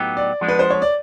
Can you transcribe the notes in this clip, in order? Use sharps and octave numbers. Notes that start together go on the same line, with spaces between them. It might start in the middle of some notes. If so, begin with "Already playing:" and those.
Already playing: A2 F#3 B3 D#4 G4
D5
F3 G#3 B3 D4
B4
C5
C#5
D5